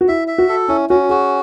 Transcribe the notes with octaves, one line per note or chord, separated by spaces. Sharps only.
F#4
E4 E5
E5
F#4
A4
C#4 E4
C#4 F#4
F#4 G#4